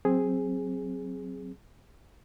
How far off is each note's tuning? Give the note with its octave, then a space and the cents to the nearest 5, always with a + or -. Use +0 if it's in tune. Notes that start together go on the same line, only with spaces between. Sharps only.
F#3 +0 C4 +10 G#4 +0